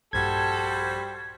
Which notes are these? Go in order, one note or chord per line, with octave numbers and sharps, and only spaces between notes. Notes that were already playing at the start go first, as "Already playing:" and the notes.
A#1 G2 G3 F#4 A4 C5 G#6